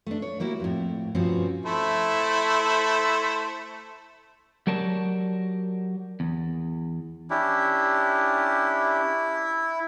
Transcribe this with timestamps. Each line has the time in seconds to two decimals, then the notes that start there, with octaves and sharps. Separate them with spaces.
0.06 A3 D4
0.22 C#5
0.40 G3 A#3 E4 F#4
0.60 F2 A2
1.15 G2 B2 F3 C4 C#4 F#4
1.66 A3 E4 C5
4.67 F#3 G4 A#4 C#5 D5 A5
6.20 E2
7.30 C#4 D4 E4 G4